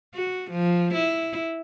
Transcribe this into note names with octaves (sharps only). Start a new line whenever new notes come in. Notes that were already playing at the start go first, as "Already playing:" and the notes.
F#4
F3
E4